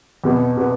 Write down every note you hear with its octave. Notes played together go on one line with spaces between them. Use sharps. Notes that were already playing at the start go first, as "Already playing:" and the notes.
E2 B2 B3
B2 B3